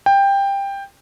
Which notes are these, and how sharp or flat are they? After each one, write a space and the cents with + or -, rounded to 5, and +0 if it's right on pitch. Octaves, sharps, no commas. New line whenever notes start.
G5 +15